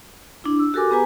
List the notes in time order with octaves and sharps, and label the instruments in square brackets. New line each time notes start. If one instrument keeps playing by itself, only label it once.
[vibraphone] D4 E4
E6
F#4 G4 A4 A#4 G#5 D6
B3 G4 G#4 B4 G#5 A#5